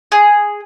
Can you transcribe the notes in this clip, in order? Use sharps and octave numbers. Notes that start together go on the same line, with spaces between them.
G#4